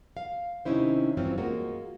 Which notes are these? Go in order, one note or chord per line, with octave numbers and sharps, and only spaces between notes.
F5
C3 D#3 C#4 D#4 E4 C5
G2 E3 F#3 C4 C#4 F4
G#3 A#3 F4 F#4